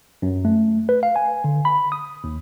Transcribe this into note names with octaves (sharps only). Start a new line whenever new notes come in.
F#2
A3
B4
F5
G#5
D3
B5
D#6
D#2